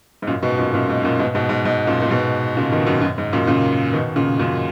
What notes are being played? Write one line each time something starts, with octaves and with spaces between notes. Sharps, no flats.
G#2
F#2 A#2
G#2 B2
F#2 A#2
F#2 A#2
G#2
F#2 A#2
G#2 B2
G#2 B2
G#2
G#2
F#2 A#2
A#2
G#2 B2
A#2 C#3
B2 D#3
F#2
F#2
G#2
F#2 A#2
A#2 C#3
B2 D#3
A#2 C#3
F#2 A#2